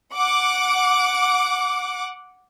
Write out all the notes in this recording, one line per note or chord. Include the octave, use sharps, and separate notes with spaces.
F#5 D6